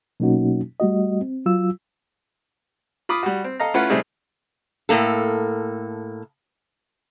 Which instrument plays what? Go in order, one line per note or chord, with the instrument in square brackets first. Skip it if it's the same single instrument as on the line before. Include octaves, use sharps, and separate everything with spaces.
[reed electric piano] B2 F#3 A#3 C#4 D#4 F#4
G3 A3 F#4 D#5
C4
F#3 F4 E6
[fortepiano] F4 B5 D6 D#6
G3 F#4
C4
A4 D#5 F5 A#5
A3 C#4 E4 F4 B4 F#5
C3 G3 A3 C4 D#4 G#4
[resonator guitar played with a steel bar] A2 C#3 A#3 A4